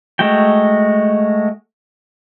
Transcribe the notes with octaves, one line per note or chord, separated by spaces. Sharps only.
G#3 A3 F#4 G5